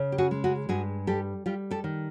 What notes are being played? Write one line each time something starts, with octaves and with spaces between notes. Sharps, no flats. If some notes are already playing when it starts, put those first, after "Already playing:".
Already playing: C#3 C#4
G4
F#4 G#4
G#3
F#4 G#4
G2 F#4 G#4
G3 G4 A4
G3 F4 G4
G4 A4
D#3